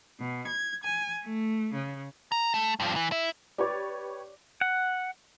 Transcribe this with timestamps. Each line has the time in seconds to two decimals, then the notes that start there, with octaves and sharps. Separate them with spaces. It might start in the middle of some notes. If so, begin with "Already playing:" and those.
0.18 B2
0.48 G#6
0.83 G#5
1.24 A3
1.73 C#3
2.32 A#5
2.54 A3
2.80 G2 F3
2.96 E3
3.12 E4
3.58 G4 B4 C#5 D5
4.61 F#5